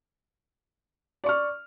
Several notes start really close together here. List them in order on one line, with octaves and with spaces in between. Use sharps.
D5 C#6 F6